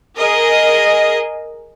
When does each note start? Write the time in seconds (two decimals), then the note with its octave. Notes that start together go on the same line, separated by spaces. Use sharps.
0.16 G#4 A#4 D#5